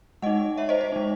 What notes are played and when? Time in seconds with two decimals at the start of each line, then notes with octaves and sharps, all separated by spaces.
0.22 G#3 D#4 D#5 F#5
0.57 C#5 E5
0.69 C5 D#5
0.81 C5
0.92 G#3 D#4